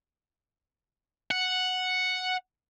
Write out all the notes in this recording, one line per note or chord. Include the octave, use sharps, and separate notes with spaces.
F#5